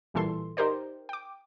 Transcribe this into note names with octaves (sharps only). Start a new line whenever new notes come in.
A1 A#2 E3 G3 A4 C6
D#4 G4 A#4 C5 D5
G5 D6